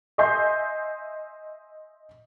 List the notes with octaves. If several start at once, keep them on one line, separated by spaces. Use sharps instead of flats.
D#5 E5 G#5 C6 G6 C7